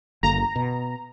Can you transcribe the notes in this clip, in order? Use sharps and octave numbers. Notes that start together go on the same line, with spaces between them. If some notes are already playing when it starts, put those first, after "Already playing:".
F#1 D3 A#3 A#5
B2